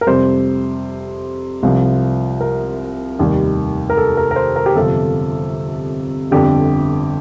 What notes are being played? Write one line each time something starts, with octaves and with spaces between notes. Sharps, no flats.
A#4
F2 C3 G3 C5
C2 C3 F3
A#4
F1 D#2 D#3 G3
A#4
A4
A#4
A#4
C5
A#4
G4
G1 F2 C3 F3 A4
G1 F2 D3 G4